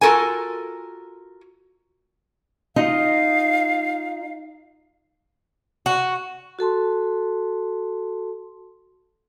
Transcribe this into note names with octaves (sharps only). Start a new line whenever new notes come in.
F4 F#4 A4 A#4 G#5
D#4 F4 D#5 F5
F#4
F#4 A4 A5 C6